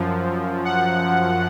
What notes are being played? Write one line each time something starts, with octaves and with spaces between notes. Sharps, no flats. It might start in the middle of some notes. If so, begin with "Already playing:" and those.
Already playing: F#2 F3
F#5